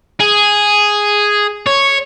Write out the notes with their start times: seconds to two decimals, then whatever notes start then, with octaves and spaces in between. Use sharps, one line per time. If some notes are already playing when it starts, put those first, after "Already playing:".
0.20 G#4
1.66 C#5